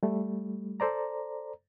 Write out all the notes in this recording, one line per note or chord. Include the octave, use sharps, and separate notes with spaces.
G3 A3
A4 C5 D5 A#5